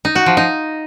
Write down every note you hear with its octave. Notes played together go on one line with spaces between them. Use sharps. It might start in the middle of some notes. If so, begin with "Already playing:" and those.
D#4
F#4
F3
D#4